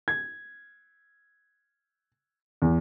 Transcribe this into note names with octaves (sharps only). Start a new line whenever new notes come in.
G#6
E2